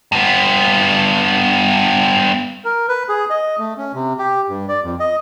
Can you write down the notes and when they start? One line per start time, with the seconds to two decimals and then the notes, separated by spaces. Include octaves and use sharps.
0.12 G2 B3
2.65 A#4
2.88 B4
3.09 G#4
3.30 D#5
3.59 A3
3.78 C#4
3.94 C3
4.19 G4
4.48 G2
4.68 D5
4.84 F2
5.00 D#5